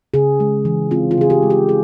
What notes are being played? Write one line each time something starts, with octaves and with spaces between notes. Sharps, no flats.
C#3 G#4
G#3
E3
C4 F4
F4
C#3 G#4
G4
G#3
G4
G#4